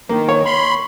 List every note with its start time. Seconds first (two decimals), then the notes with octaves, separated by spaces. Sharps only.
0.09 D#3 A#3
0.29 C#5
0.45 B5 C6